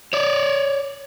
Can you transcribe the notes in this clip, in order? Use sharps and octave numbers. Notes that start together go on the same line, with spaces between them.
C#5 D5